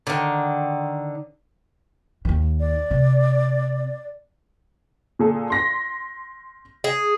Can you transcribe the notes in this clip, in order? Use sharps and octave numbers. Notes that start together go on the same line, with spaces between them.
D3 D#3
D#2 D#3
D5
C3
A#2 G#4 A4
C6 A#6 B6
G#4